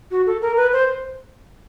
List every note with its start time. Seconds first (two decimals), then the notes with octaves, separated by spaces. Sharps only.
0.11 F#4
0.27 A4
0.42 A#4
0.57 B4
0.73 C5